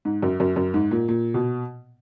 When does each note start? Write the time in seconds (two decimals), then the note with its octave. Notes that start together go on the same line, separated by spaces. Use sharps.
0.05 G#2
0.23 F#2
0.40 F#2
0.56 F#2
0.74 G#2
0.91 A#2
1.08 A#2
1.34 B2